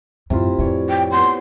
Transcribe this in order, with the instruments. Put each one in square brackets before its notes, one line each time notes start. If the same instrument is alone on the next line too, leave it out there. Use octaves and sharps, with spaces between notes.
[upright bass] F#2 A2 [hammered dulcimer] C3 E4 F4
[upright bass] F2 A2 [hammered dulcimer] E3 C#5 D5
[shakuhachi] G5
[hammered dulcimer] B3 C5 G5 [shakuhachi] C6